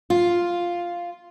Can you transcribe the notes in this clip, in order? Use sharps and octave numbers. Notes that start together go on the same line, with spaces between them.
F4